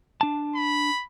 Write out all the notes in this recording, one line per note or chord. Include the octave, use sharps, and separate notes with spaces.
D4 A5
B5